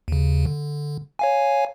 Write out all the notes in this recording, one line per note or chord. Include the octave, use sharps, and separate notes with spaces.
D#2 C#3
D3
C#5 F5 G#5